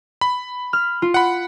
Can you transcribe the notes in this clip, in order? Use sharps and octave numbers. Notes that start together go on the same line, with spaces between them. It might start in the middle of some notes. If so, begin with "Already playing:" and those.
B5
F6
F4
F#5 B5